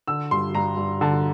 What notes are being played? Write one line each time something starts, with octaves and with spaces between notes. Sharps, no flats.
D3 E6
G2 C6
G2 A#5
G2
D3 A5